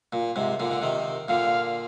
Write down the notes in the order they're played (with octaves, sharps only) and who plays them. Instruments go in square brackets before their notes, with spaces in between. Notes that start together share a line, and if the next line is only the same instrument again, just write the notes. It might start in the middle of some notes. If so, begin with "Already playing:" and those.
[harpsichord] A#2
G#2 C3
A#2 D3
D3
C3 D#3
[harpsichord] A#2 D3 [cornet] F5